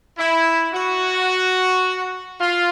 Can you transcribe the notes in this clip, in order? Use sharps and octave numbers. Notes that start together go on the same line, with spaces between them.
E4
F#4
F4